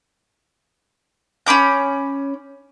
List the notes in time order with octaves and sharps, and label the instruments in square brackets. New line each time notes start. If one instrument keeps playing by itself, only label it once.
[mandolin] C#4 B5 D6 G6